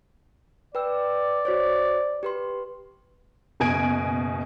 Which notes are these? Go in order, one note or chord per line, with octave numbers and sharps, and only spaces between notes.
B4 D5 G5 E6
F#4 C5 C#5
G4 B4 C6
F#1 B2 G#5 G#6 D7